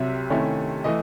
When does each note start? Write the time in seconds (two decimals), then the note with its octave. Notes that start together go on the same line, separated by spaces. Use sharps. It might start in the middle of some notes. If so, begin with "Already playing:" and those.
Already playing: C2 C3 F#3 E5
0.30 C3 D#3 A3 C#4 E4
0.84 E3 A3 D#5